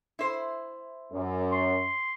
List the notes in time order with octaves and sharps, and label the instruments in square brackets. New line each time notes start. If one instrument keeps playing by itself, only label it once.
[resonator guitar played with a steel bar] E4 C5
[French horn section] F#2
[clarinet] C6